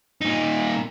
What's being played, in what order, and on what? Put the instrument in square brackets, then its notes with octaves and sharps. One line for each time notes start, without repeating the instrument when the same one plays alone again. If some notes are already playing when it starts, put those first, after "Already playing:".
[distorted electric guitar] A#2 D#4